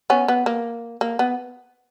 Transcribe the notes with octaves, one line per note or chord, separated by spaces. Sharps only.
B3 C#4
B3
A#3
A#3
B3